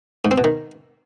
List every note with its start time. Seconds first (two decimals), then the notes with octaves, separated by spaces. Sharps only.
0.25 G#2
0.31 C4
0.38 B2
0.44 D#3